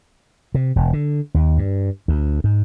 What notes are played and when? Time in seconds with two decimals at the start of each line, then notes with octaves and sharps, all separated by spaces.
0.54 C3
0.76 E1
0.93 D3
1.34 D#2
1.58 G2
2.08 D2
2.44 G#2